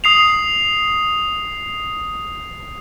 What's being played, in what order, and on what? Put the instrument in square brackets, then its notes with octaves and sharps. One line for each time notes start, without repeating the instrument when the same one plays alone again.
[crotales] D#6 C7 F7